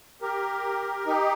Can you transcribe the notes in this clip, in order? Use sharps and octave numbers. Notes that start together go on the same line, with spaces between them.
G4 A#4
D#4 G4